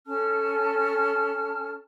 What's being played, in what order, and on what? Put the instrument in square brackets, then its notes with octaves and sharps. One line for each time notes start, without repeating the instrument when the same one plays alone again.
[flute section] C#4 A4 A5 F6